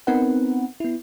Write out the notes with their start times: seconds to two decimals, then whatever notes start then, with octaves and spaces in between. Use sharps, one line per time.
0.07 B3 C4 D#4 A#4 B4 F#5
0.80 B3 E4